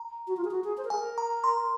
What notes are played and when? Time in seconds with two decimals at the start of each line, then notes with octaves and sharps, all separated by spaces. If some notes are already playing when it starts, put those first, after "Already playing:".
Already playing: A#5
0.27 F#4
0.37 F4
0.44 G#4
0.51 F#4
0.64 G#4
0.77 C5
0.85 A#4
0.90 G#4 G#5
0.99 A#4
1.18 A#5
1.44 C6